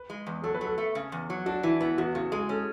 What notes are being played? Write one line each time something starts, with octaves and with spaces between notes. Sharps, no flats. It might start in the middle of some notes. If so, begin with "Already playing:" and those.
Already playing: B4
G#3
E2
F#3 A4
B4
F#3 A4
A3
C#3
E2
F#3
D4 F#4
E3 E4
B3 E4
E2 F#4
C#3 F#4
G#3 G#4
C#4 A4